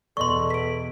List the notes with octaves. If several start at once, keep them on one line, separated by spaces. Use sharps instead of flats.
E2 B2 A4 D5 D#5 C6 C#6
B6 D7